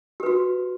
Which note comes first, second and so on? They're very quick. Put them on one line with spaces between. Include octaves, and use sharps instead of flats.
G4 B4 F#4